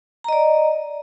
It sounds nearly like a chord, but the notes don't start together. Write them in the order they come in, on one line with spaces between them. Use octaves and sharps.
A#5 D#5 D5